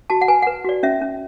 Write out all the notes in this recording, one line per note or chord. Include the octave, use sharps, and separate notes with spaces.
F#4 A5
F#5
B4 G#5
B4 F#5
F#4 D5
C#4 E5
C#4